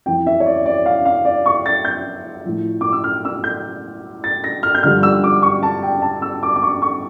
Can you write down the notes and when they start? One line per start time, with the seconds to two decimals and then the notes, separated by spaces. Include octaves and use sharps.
0.06 F2 E3 G5
0.27 E5
0.40 C#5
0.46 D5
0.66 D5
0.86 F5
1.05 F5
1.25 D5
1.46 C#6
1.66 A6
1.85 G6
2.45 A2 F3
2.81 D6
2.92 E6
3.04 F6
3.25 E6
3.44 G6
4.24 A6
4.44 A#6
4.63 F6
4.75 G6
4.83 G2 D3 F3 F6
5.03 E6
5.24 D6
5.42 C#6
5.63 A5
5.83 G5
6.02 A5
6.22 E6
6.43 D6
6.56 D6
6.63 C#6
6.82 C#6